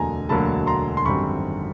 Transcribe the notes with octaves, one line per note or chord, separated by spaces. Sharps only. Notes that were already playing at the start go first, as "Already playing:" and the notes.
Already playing: E1 D2 D3 F#3 A#3 G#5 A#5
E1 D2 D3 F#3 A#3 A5 B5
A#5 C6
C6
G#1 F#2 D3 G3 C4 B5 C#6